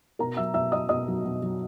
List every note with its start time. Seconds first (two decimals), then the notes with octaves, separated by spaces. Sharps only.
0.19 B2 A#4 A#5
0.37 F#3 E5 E6
0.54 B2 E5 E6
0.72 F#3 D#5 D#6
0.89 B2 D#5 D#6
1.07 F#3
1.24 B2
1.42 F#3